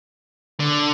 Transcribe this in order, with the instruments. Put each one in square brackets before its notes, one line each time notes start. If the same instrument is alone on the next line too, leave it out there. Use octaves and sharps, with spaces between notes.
[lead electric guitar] D3